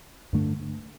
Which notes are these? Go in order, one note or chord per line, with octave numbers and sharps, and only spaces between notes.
G2 D3 A3 D4